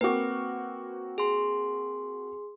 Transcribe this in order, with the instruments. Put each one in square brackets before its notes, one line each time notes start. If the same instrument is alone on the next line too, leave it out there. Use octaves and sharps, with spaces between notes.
[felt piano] A#3 C4 F#4 [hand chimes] B4 D6
[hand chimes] G#4 C6